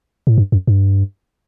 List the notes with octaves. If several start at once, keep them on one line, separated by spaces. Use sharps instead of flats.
A2
G2
F#2
G2